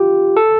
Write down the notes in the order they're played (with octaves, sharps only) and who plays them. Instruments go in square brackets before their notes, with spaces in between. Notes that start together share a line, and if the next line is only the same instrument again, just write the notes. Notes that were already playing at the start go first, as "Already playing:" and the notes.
Already playing: [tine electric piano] F4 G4
A4